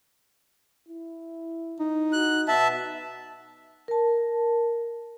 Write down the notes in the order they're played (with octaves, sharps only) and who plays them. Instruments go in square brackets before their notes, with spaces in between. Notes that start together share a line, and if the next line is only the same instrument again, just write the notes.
[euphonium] E4
[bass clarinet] D#4
[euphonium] F#4 [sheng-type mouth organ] F#6
[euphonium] B2 [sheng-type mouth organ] E5 A5
[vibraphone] A#4 A5